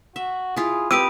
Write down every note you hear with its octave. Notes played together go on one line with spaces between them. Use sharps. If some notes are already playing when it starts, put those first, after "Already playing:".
F#4 E5
E4 F4 G#4
A#3 C4 G4 B4 D#6 E6 D7 D#7